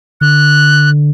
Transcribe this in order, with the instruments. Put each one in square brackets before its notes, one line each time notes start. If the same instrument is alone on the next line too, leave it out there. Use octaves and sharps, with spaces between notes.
[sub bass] D3 [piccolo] F#6